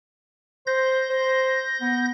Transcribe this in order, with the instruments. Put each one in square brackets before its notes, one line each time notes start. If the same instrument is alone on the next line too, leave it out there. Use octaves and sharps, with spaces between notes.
[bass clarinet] C5 [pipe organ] G6 A#6
[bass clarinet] C5
B3